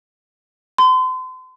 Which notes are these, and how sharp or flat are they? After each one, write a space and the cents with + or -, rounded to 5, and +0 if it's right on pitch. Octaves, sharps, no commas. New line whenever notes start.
C6 -35